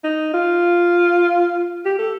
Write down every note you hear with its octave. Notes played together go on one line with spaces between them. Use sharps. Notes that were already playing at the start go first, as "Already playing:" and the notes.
D#4
F4
G4
A4